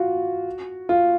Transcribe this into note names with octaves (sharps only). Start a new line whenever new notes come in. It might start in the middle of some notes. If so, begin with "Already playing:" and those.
Already playing: F4 F#4
F4